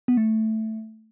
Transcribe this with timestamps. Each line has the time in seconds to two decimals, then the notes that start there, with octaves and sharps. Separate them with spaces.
0.08 B3
0.17 A3